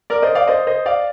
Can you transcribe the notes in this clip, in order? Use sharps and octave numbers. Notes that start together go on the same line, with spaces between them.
A#4 D5
C5 D#5
D5 F5
C5 D#5
C5 D#5
D5 F5